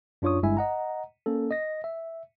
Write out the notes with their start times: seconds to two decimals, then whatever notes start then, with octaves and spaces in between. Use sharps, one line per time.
0.22 F#2 D4 F4 C#5 C#6 D#6
0.42 G1 G2 G#3 E4 E5 G#5
0.57 D#5 F#5 A#5
1.26 A#3 C#4 A4
1.51 D#5 A#6
1.84 E5